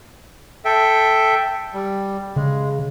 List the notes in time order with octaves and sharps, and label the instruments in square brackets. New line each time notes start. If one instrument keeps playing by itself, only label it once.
[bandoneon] A4 E5 G5
G3
[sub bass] C#3 [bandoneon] G#3